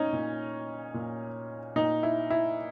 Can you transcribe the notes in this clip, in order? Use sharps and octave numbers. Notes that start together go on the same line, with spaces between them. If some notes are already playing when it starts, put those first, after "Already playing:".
Already playing: A#2 C#4 D#4
A#2
A#2
A#2 D#4
E4
E4